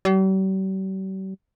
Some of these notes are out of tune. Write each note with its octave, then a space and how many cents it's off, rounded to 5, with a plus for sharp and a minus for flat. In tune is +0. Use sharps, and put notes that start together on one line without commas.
G3 -45